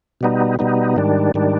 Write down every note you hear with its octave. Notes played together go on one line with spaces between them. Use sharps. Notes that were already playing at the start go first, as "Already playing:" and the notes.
B2 G3 B3 D#4
B2 G3 B3 D#4
G#2 D#3 G3 D4
G#2 D#3 G3 D4